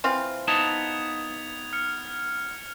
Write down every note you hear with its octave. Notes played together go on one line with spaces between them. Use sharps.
E3 C4 F4
B3 D#4 A5 G#6 F7
F6 C#7